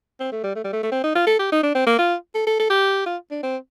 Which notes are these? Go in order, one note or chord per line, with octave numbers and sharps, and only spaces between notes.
C4
A3
G3
A3
G3
A3
A3
C4
D#4
F4
A4
G4
D#4
D4
C4
A#3
F4
A4
A4
A4
G4
F4
D4
C4